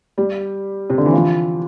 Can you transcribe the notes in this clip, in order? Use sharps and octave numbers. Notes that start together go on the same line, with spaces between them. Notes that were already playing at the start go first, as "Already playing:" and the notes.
G3
C3
D3
E3
F3